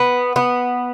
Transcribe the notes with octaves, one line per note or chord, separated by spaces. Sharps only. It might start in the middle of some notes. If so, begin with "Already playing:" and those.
Already playing: B3
B3